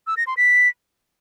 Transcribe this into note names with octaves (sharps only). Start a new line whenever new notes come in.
E6
A#6
C6
B6